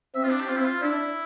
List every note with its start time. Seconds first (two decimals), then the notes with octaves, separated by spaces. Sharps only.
0.15 C4 E5
0.23 F4
0.31 D4
0.40 G4
0.48 C4 F4
0.57 E4
0.65 F4
0.82 D4 E4